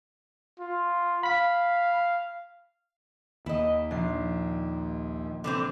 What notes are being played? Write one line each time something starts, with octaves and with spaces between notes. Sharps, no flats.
F4
F5 B5 B6
D#2 E4 D#5
A#1 C7
D3 E3 C4